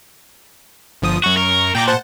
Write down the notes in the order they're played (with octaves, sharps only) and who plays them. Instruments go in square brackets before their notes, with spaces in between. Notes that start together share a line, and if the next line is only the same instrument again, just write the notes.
[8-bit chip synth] G1 F3 D#6
[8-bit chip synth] F#2 C#6 [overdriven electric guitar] F#4
[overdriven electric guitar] A#4
[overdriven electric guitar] A#2 [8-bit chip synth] G5 A#5 D6
[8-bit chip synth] C5 F#5 A5